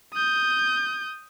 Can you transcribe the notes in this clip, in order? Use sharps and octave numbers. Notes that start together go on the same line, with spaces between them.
D#6 G6